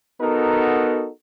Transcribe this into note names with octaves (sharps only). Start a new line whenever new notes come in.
B3 D#4 F#4 A4 A#4